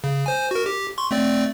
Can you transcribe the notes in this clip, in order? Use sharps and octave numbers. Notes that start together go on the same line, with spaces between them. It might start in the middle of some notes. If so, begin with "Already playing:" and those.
C#3
C5 G#5
F#4 A#4
G4
C6 C#6
A3 C4 D5